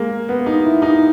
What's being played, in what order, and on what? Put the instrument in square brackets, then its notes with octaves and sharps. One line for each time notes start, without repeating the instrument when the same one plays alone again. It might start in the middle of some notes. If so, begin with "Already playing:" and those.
Already playing: [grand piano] G#3 A#3
B3
D#4
E4
D#4